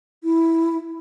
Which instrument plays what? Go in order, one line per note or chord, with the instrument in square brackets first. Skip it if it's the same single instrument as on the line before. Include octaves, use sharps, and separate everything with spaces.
[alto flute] E4